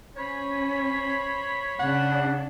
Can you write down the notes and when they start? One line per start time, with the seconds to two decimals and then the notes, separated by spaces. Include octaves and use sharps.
0.17 C#4 C5 C#5 B5
1.79 C#3 D4 F#5